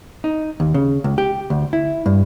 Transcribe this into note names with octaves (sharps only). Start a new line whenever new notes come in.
D#4
D#2
C#3
C#2
G4
D2
E4
G2